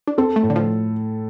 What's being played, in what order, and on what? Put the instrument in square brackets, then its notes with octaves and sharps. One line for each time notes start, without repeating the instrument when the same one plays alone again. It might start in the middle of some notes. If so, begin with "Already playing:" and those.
[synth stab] D4
[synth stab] C4 [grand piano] A4
[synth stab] A3
[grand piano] A2
[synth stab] D3
F3